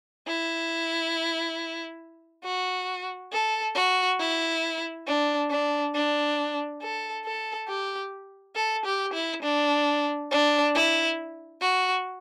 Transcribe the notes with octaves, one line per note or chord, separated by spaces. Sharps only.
E4
F#4
A4
F#4
E4
D4
D4
D4
A4
A4
G4
A4
G4
E4
D4
D4
E4
F#4